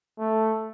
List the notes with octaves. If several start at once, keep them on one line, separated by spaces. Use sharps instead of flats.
A3